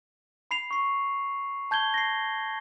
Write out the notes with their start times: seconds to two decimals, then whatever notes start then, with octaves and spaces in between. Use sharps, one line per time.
0.51 B5 C7 F7
0.71 C#6 C7
1.71 A5 G6 G#6 G7
1.94 A#6 C7